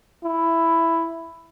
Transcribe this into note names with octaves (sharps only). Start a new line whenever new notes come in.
E4